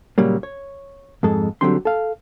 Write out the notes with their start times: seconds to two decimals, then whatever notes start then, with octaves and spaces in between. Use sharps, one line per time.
0.18 A#2 C#3 F#3 G3 A#3
0.43 C#5
1.23 F2 G#2 G#3 A4
1.61 D3 F#3 G3 C4 D4 C6
1.85 A4 F5